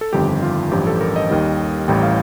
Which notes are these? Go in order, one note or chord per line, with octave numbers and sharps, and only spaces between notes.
A4
G1 F2 D#3 G3 G4
G4
F4
A1 G2 F3 G4
A4
A#4
D#5
D#2 D#3 G3
A1 A2 G3 G5
F5